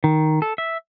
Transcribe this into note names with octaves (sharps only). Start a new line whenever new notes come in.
D#3
A4
E5